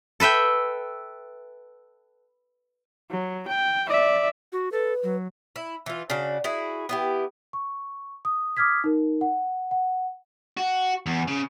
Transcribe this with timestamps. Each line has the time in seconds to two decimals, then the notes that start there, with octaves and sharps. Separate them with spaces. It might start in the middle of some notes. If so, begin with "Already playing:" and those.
0.20 A4 B4 E5 G5
3.11 F#3
3.48 G5
3.88 D5 E5
4.52 F#4
4.72 A4 B4
5.03 F#3
5.56 E4
5.86 E3 F4
6.10 C#3 D4 F#4
6.44 E4 F#4 G#4
6.89 B3 E4 G4
7.53 C#6
8.25 D#6
8.57 D6 D#6 F6 G#6 B6
8.84 D#4 A#4
9.21 F#5
9.71 F#5
10.57 F#4
11.06 E2
11.28 C#3